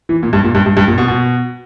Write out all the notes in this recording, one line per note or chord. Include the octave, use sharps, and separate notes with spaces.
E3
A#2
G2
A#2
G2
G2
G2
A#2
B2
B2